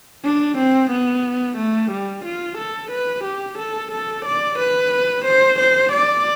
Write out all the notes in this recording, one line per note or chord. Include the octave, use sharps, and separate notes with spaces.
D4
C4
B3
A3
G3
F4
A4
B4
G4
A4
A4
D5
B4
C5
C5
D5